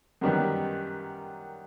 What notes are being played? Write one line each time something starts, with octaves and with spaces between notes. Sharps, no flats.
F#2 D#3 G3 B3